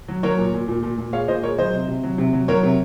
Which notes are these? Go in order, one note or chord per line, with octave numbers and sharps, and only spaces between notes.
F#3
F#3 A#4 C#5
A#2
A#2
A#2
A#2
A#2
G#3 C#5 F5
A#2 C5 D#5
G#3 A#4 C#5
F#3 C5 D#5
C3
C3
F#3
C3
F#3
F#3 A#4 C#5
C3